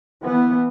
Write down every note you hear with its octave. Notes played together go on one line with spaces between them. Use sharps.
E3 B3